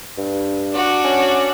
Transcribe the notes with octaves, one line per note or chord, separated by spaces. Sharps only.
G2
D4 F#4
C#4